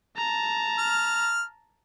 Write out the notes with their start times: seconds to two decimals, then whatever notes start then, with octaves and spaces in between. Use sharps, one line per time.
0.17 A5 A#5
0.79 F6